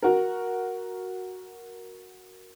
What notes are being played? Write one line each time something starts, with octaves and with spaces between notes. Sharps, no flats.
F#4 A#4